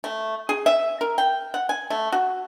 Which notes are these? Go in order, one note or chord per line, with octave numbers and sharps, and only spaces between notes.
A3
G#4
E5
A#4
G5
F#5
G#5
A3
F#4